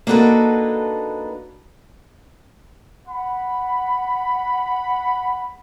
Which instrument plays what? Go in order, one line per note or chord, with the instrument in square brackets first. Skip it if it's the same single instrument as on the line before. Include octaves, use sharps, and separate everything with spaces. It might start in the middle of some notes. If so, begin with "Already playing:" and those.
[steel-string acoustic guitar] A#3 D4 D#4 F#4 A4 B4
[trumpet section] F#5 B5